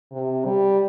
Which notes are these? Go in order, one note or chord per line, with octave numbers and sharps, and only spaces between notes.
C3
G3